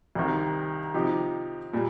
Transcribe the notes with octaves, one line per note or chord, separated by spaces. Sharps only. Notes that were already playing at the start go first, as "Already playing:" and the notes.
C2 C3 D#3
C3 F3 D#4 G4
A#2 G3